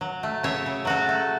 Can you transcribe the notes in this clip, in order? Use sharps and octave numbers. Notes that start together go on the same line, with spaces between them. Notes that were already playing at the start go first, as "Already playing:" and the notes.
F#3
A3
C#3 C#5 E5
C#3
F#3 F#4 A4
A3